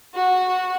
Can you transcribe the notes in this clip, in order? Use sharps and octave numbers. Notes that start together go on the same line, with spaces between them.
F#4